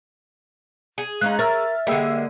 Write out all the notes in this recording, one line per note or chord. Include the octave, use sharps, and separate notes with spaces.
G#4
G#3 C#4 D#4 F5 F#6
A#4 C#5 E5 E6 F6 A6
D3 G3 G#3 A#3 D#5 G5 E6